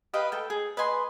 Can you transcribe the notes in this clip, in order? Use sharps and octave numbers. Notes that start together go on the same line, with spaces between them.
G4 B4 D#5 F5
A4 G5
G#4
B4 D#5 G#5 C6